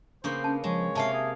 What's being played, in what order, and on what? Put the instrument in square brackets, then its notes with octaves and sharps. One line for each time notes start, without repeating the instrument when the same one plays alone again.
[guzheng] C#3 A#3 B3 [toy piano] D4 C#6 [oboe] C5
[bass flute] C#4 [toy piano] A5
[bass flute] F3 [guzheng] G#3 [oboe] C#5
[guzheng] C3 A#3 F5 [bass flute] E5 [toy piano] G#5 A5
[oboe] G#4